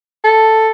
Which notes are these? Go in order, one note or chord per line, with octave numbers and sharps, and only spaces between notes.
A4